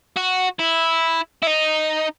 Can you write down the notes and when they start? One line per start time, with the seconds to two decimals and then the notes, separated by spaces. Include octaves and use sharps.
0.17 F#4
0.60 E4
1.42 E4
1.47 D#4